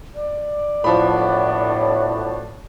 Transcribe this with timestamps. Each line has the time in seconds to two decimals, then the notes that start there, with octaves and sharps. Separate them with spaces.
0.15 D5
0.84 A2 F3 B3 D4 F#4 B5